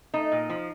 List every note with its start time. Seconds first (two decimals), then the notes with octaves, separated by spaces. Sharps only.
0.14 A3 D#4
0.32 A#2
0.50 F3